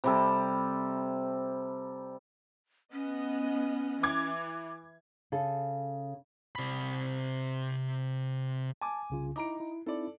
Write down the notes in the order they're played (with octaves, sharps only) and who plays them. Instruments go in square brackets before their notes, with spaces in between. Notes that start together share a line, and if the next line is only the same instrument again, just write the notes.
[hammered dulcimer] C3 G3 A4
[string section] B3 D#5 [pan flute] C#4
[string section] E3 [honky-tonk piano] D6 G#6
[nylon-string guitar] C#3 A4
[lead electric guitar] C3 B5
[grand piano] G#5 D6 [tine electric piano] A5
[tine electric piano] C2 C#3 F4
[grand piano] D#4 A#5 D7 [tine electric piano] E4 D6
[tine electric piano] E4
[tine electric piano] C4 D#4 E4 [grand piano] A4 D5